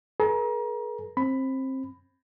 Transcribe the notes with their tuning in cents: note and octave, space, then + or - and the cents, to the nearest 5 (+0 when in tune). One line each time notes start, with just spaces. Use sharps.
G#4 +45 B4 -45 A#5 +30
C4 +20 B5 +10